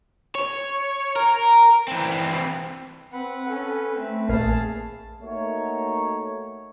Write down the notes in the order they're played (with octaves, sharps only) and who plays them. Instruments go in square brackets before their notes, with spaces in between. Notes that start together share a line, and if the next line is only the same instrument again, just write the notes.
[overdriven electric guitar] C#5
A#4
E3 C4
[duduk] C4 [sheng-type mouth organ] B4 [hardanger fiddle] F#5
[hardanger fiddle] C#4 [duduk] A4
[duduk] A3 [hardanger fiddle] C4
[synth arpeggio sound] A#1 A#3 [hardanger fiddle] G#4 A5 [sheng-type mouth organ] F5
[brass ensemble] A3 A#3 D#4 F#4 C#5